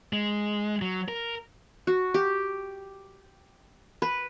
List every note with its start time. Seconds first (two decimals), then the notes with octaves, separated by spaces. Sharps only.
0.13 G#3
0.82 F#3
1.08 A#4
1.87 F#4
2.14 G4
4.02 B4